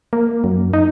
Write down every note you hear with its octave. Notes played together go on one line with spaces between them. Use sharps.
A#3
F#2
D#4